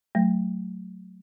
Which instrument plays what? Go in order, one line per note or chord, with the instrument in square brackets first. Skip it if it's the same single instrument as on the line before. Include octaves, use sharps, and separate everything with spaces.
[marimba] F#3 A3